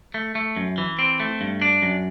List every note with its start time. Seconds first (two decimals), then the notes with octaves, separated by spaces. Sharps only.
0.14 A3
0.35 A3
0.57 F#2
0.78 E3
0.99 C4
1.20 A3
1.41 G2
1.62 D4
1.82 F#2